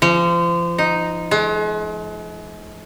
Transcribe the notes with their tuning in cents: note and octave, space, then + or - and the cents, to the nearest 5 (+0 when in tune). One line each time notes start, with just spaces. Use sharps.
F3 -30
D#4 +0
G#3 +40